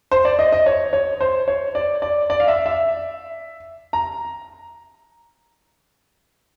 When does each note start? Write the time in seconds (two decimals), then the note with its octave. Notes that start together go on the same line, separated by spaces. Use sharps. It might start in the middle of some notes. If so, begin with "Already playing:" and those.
0.12 C5
0.25 D5
0.39 D#5
0.52 D#5
0.66 C#5
0.93 C#5
1.21 C5
1.48 C#5
1.75 D5
2.02 D5
2.30 D5
2.40 F5
2.48 E5
2.66 E5
3.93 A#5